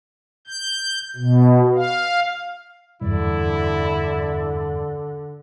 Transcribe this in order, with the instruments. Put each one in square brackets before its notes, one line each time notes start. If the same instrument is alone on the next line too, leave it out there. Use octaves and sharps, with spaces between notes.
[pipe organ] G6
B2
F5
[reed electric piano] E2 G2 [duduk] D3 [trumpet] E4 [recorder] D5